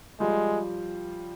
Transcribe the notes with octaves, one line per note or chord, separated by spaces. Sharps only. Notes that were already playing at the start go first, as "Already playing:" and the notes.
F3 G3 G#3